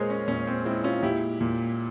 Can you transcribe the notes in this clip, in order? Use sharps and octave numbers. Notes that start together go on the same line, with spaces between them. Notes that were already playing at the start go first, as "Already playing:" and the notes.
Already playing: A#2 G#3 G#4 A#4 C5 C#5
C#4
A#2 C#4
C4
G#3 C4 E4
C#4 F4
A#2 E4 G4
A#2